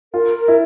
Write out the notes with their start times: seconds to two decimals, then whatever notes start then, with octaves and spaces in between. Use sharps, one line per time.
0.14 F4 A#4
0.37 A#4
0.48 E4